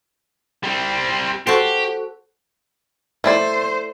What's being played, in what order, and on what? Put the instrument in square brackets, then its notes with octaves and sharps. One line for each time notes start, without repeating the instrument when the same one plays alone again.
[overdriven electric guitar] G3 C4
[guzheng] F#4 A4 C5 [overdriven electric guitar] G4
[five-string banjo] A3 E4 D5 [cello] C5